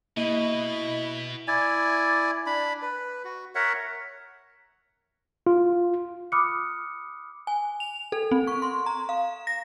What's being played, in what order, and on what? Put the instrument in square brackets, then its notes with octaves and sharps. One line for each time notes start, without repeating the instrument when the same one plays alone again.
[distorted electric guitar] B2 [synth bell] A#3 D#7 F#7 [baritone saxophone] E4 [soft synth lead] D#5
[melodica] E4 D5 G#5
D4 B5
B4
F#4
A#4 C#5 E5 F#5
[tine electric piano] F4
[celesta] B5 D6 D#6 F6 F#6 C#7
[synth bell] G#5
F7
A4
C4
C#6
C6
A#5
F5
A#6